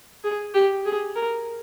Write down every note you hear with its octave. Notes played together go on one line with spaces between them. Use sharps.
G#4
G4
G#4
A#4